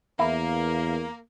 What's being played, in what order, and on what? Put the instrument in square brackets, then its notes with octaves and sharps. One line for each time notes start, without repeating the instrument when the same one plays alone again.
[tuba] E2 [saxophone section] A#3 [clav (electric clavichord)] E4